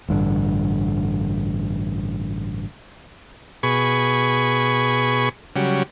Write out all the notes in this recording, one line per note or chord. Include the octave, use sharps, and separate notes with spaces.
A1 G2 D3
B2 G#4 B5 C#6
C#3 F#3 G3